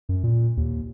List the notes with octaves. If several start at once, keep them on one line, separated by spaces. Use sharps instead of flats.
F#2
A#2
D#2